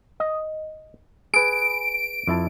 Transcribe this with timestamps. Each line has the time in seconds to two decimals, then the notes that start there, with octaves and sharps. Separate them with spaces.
0.20 D#5
1.34 G#4 B4 D7
2.27 F2 E4 A5